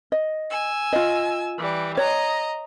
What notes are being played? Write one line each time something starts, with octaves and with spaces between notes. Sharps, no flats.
D#5
G#5 E6
F4 D#5
E3 G3
C#5 D#5 A#5